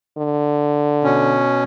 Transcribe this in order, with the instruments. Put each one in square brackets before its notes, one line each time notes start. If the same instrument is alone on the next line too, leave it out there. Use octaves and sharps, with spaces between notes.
[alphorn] D3
[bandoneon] B2 C#4